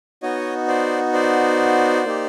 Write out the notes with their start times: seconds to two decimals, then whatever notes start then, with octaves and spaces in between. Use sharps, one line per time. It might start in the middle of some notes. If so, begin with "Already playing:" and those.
0.22 B3 D#4 F#4 C#5 D#5
0.68 C5 D5
1.13 C5 D5
2.05 A#3 D#4 G4